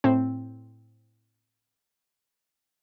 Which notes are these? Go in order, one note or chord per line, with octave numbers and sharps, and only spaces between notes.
A2 C4